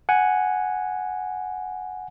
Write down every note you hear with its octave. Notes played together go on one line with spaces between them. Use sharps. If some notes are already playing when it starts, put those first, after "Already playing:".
F#5 G#5